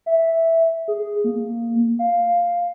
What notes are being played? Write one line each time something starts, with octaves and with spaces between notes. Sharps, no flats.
E5
G#4
A#3
F5